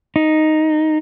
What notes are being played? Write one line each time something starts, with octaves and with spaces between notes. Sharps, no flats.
D#4